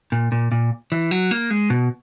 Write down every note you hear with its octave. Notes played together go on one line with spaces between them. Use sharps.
A#2
A#2
A#2
E3
F#3
A#3
G#3
B2